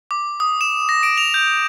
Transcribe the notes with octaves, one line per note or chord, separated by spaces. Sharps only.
D6
D#6
E7
A#6
D7
F7
G6